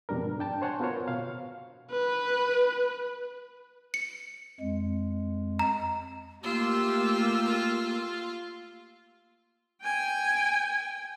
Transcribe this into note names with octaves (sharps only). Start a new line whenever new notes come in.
F2 B2 G3 D4 A#4
G#2
D4 G5 A5
C5 C#5 F#5 G#5 A5
B3 F4 F#4 A#4 C5 C#5
B2 F5
B4
C#7
F2 G#3
A#5
A3 A#3 F4 G4 E6
G5 G#5